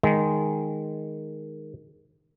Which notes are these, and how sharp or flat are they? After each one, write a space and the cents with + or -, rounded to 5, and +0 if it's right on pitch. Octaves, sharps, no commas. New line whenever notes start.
D#3 +0 G#3 +0